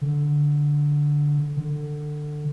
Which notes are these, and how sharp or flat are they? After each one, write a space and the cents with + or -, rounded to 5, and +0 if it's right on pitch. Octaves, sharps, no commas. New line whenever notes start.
D3 -5
D3 +20